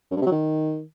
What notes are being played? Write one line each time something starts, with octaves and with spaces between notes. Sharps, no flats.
F#2
G2
C3
F#3
D#3